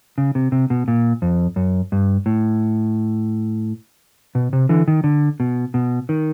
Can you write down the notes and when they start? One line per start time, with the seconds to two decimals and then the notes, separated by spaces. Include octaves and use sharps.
0.18 C#3
0.35 C3
0.52 C3
0.70 B2
0.88 A#2
1.22 F2
1.56 F#2
1.92 G2
2.26 A2
4.35 B2
4.53 C3
4.69 D3 E3
4.88 D#3
5.04 D3
5.40 B2
5.74 B2
6.09 D#3